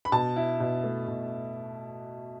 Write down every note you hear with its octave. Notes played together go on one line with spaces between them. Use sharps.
B5
B2 A5
E4
B2
A3
B2